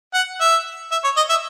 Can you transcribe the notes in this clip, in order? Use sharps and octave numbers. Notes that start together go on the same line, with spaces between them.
F#5
E5
E5
C#5
D#5
E5